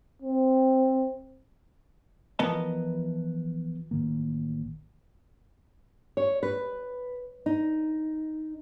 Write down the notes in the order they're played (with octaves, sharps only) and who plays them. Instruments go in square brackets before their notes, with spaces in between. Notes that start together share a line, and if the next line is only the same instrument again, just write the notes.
[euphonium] C4
[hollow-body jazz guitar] E3 F3 B3 A#4 D#5 A5
[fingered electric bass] A1 D#3 A#3
[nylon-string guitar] C#5
B4
D#4